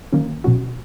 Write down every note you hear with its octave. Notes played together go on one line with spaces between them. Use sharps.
D#3 F#3 A#3 C#4
B2 F#3 C#4 F#4